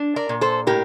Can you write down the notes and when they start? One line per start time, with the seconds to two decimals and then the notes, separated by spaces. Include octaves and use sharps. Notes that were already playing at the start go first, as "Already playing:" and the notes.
Already playing: D4
0.16 A#4 D5
0.29 A#2
0.41 A4 C5
0.67 A2 G4 A#4